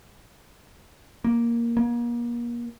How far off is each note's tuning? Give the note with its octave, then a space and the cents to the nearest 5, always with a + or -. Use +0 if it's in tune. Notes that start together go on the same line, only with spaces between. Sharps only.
A#3 +5
A#3 +35